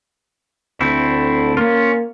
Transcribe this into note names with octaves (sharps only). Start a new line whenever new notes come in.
D2 A3 C4 E4
A#3 C#4 F4